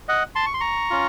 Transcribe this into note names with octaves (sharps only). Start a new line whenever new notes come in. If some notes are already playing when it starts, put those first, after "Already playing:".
D#5 F#5
A5 C6
C#6
C6
A#5 C#6
C#4 F4